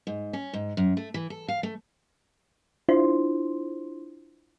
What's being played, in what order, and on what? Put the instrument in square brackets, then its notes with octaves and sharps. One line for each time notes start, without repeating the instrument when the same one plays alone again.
[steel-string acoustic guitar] G#2
C#4
G#2
F#2
A3
E3
A4
F5
A3
[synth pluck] D4 E4 F4 C5 C6